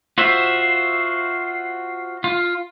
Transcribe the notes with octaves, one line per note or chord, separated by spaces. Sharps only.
F4 F#4 C5 E5
F4